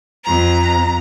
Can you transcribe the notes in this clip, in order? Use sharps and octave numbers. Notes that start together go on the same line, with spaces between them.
F2 A#5